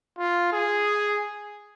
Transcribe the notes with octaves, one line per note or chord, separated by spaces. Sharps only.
F4
G#4